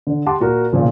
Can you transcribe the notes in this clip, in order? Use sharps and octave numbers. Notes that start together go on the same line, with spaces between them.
D3
G4 F#5 A5 C6 D6
A#2 F#4 A#4
B1 A#2 C#3 F3